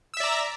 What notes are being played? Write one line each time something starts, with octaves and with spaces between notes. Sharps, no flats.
D5 E5 A#5 E6